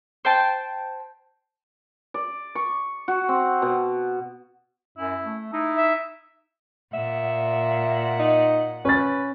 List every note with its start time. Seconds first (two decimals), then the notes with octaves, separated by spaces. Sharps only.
0.25 C5 G5 A5
2.14 D5
2.55 C#6
3.08 F#4
3.29 C4
3.62 B2
4.98 F#2 E4
5.26 A3
5.53 D#4 E4
5.77 E5
6.94 A#2 E5 F#5
8.19 D#4
8.85 C#4 B4 A6